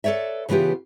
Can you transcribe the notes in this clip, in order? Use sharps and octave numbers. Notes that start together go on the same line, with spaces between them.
A4 B4 C#5 D5 E5
C#3 E3 B3 F4 G4